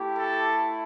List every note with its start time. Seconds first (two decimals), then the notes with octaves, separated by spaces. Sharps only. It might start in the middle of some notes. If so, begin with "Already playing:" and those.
Already playing: A3 E4 G4
0.16 A4